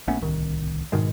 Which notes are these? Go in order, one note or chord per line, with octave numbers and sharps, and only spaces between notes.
A#1 A3 B3 C#4
D1 C2 D#3
G#2 B2 D#3 G#3